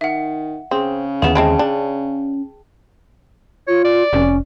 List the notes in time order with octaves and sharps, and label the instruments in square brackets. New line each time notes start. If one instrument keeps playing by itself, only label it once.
[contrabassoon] D#3 [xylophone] E5 F#5
[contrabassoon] C#3 [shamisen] C4 [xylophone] G#4
[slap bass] D#2 D3 [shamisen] E3 B3 [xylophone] G#4 E7
[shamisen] G#3 C4 E4 [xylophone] G5 A5
[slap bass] C#4 [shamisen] D4
[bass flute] F4 [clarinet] C#5
[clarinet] D5
[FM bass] F1 [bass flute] C#4